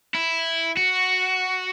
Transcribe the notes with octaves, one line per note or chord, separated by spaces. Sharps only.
E4
F#4